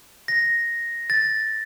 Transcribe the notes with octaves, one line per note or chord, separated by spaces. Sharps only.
A#6
A6